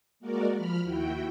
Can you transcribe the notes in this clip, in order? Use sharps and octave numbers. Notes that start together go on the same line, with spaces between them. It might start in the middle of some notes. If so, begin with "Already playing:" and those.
G#3 A#3 F#4 A#4 D5
F3 B5 F6
D#2 E4 F#4 G5